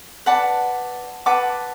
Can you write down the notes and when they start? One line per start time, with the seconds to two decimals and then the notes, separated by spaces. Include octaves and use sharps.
0.26 B4 D5 F#5 A5
1.26 B4 F#5 A5 D6